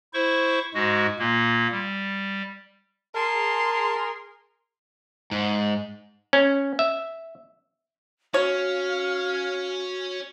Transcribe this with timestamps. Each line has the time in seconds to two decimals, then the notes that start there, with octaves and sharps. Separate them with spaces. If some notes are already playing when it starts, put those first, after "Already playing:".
0.14 E4 C5 C#6
0.74 G#2 G#3 F#4
1.19 A#2 A#3
1.71 G3
3.15 G#4 A#4 A5 C6
5.31 G#2
6.33 C#4
6.79 E5
8.34 C#4 F#4 C#5 F5